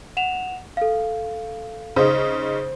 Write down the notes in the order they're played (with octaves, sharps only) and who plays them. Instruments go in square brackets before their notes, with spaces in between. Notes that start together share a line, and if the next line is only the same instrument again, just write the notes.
[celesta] F#5 E7 F7
A4 F5
[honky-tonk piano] C#3 D#4 [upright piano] C5